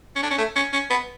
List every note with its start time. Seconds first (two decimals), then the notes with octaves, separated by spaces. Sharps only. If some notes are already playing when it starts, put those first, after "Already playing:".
0.16 C#4
0.23 D4
0.30 C#4
0.38 A3
0.56 C#4
0.73 C#4
0.90 B3